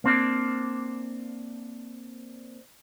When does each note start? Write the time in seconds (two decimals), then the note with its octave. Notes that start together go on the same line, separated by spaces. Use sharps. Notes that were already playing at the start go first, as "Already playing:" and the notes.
0.04 A#3 C4 D4